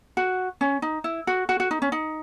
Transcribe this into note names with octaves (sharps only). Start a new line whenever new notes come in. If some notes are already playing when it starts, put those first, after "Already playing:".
F#4
C#4
D#4
E4
F#4
F#4
F#4
D#4
C#4
D#4